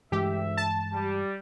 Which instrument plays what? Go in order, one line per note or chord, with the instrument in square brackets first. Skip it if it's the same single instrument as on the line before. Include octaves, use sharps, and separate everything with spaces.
[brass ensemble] D2 E5 [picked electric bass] G2 E3 G#3 [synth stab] G4
[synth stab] A5
[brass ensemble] G3